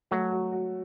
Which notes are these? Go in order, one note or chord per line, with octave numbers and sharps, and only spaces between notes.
F#3 A3
F#4
F#4